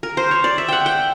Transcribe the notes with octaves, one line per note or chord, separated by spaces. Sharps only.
A#4
C5
C#5
D5
E5
F#5 G5
G5